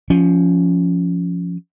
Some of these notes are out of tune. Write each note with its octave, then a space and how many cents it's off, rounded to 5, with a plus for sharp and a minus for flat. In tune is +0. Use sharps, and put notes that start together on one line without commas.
F3 +0 C#4 +15